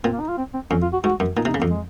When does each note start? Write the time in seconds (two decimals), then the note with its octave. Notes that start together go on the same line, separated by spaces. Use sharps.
0.04 A#2 C4
0.12 A#3
0.20 D#4
0.29 F4
0.38 C4
0.54 C4
0.70 F2 C#4
0.82 F4
0.93 F#4
1.04 G#2 F#4
1.20 F#2
1.37 A#2 D#4
1.45 C3
1.48 D#4
1.54 C#3
1.59 A#3
1.62 F2
1.70 G#3